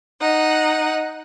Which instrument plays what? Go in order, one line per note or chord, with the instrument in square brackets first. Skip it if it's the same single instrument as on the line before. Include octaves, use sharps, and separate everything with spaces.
[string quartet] D#4 F#5